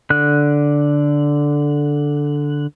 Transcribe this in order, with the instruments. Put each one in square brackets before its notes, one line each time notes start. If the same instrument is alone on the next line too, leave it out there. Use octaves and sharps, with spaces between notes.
[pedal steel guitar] D3 F#6